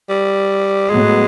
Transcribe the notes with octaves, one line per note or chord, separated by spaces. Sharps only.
G3
A2 F#3 G#3 B3